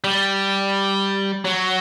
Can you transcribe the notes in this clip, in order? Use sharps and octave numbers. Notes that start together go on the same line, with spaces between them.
G3
F#3